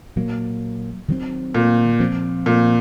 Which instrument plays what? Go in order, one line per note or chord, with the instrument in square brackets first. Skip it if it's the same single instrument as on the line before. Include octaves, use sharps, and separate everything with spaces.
[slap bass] A#2 F#3 A#3
D#3 F#3 C4
[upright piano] A#2
[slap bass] F3 C4
[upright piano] A#2